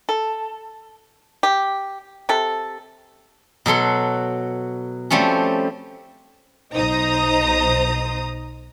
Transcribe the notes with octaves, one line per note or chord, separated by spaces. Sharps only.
A4
G4
C3 A4
B2 F#3 A4 C6
F3 G3 A3 C4 C#4
B1 D#4 C5 A#5 D#6